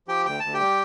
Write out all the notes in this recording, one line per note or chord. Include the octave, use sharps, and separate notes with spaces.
F3 G4 G5
D2 G5
D2 A5
G4 G5
G3